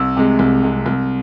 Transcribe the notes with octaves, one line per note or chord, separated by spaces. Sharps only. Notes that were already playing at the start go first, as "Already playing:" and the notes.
Already playing: C2 E6
C3 G#3
C2
C3 G#3
C2